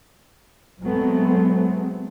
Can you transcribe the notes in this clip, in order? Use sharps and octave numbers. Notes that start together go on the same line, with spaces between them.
F#3 G#3 A3 B3 C4